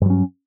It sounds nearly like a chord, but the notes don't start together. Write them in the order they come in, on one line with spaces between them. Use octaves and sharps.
G2 F#3 C#4